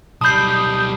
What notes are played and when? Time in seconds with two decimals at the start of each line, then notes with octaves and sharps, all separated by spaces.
0.21 B1 G3 A5 B5 D#6 G6 C7